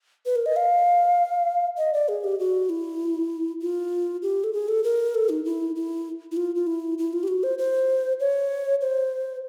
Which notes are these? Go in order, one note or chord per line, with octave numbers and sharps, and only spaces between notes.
B4
A#4
D#5
F5
D#5
D5
G#4
G4
F#4
E4
F4
G4
A4
G#4
A4
A#4
A4
D#4
E4
E4
E4
F4
F4
E4
E4
F4
G4
F#4
C5
C5
C#5
C5